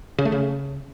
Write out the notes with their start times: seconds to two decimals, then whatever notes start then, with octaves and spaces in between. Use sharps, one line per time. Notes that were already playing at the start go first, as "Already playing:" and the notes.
0.18 C#3
0.25 A3
0.32 C#3